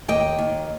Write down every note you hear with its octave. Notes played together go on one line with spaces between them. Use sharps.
D#2 D#5 G5
D#2